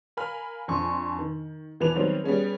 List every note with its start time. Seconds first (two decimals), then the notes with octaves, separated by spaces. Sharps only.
0.17 A#4 F5 G#5 B5 F6
0.68 F2 D4 G#5 C6 C#6
1.19 D#3
1.80 E2 E3 F3 B4 D6 F7
1.95 D#3 F#3 G3 B3 C4
2.24 G3 B3 C#4 G#4